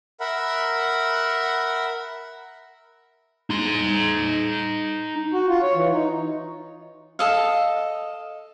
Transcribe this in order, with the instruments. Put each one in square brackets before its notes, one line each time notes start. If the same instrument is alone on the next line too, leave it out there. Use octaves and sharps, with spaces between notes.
[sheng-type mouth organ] A#4 E5 F#5 B5
[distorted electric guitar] D#4 C6
[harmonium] F#4
F4
C#5
E3
D#4
[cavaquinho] A4 D#5 F5